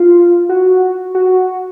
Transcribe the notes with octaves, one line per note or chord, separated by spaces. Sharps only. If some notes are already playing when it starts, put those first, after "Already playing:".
Already playing: F4
F#4
F#4